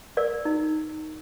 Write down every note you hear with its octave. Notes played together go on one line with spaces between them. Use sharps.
A#4 D5 E6
D#4